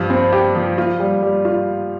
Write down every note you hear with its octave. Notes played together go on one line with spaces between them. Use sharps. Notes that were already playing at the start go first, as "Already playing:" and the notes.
Already playing: G2 F3
C4
G4
F3
F4
G3
G3
F4